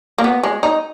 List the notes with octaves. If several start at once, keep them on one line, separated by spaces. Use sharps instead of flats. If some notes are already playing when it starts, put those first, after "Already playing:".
A#3
B3
G#3
D#4